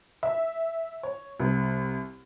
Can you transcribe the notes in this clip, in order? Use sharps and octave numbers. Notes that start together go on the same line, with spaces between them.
E5
C#5
C2